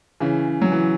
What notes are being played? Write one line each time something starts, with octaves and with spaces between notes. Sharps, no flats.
C#3 E3
F#3
E3